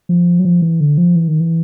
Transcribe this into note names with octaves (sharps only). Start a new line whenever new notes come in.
F3
F#3
F3
E3
D3
F3
E3
D#3
E3